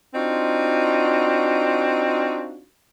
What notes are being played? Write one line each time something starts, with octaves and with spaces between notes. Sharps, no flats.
C4 D4 D#4 F4 F#4